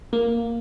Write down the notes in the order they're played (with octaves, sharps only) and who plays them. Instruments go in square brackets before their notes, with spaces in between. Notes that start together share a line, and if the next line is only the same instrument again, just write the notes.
[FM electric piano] A#3